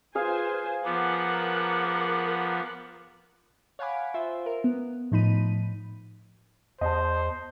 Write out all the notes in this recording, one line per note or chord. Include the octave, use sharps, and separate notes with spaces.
F4 G#4 B4 C5 F5 G#5
F3 B3 A#4 F#5 D6
C#5 F5 F#5 G#5 B5 D6
F4 C5 E5
A#4
B3
A2 F3 D#4 B5 D#7
E2 C5 D#5 A5